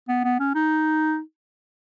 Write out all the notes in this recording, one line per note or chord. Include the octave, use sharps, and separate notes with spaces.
B3
B3
C#4
D#4